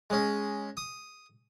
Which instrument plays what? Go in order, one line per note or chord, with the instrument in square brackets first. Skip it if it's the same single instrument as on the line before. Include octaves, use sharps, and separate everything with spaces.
[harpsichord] G#3 C#4
D#6